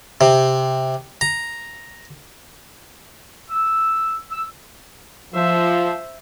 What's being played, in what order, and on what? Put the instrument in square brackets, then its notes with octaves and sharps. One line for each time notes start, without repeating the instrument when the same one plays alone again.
[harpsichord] C3
A#5
[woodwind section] E6
E6
[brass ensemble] F3 [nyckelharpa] C5 E5